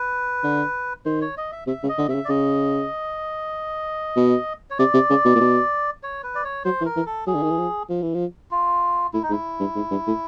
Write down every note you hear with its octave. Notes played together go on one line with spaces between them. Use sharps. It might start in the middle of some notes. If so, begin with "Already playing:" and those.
Already playing: B4
D3
D#3 C5
C#5
D#5
E5
C3 E5
C#3
D#5
D3
C3 E5
C#3
D5
C#3 D#5
B2
C#5
C3 D5
C3
C#3
B2
A#2
B2
C#5
B4
D5
C#5
F#3 C5
E3
A#4
E3
A4
F#3 G#4
D3
D#3
E3
F3
F3
E3
F3
F4
A2 E4
D#4
G#2 E4
G2
G#2
G2
A2